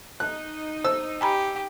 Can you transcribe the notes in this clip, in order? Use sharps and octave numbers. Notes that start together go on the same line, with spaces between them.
D#4 F#6
C5 E6
G4 G#5 A#5 B5